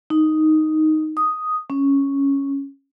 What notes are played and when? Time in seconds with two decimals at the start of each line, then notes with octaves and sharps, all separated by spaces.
0.10 D#4
1.17 D#6
1.70 C#4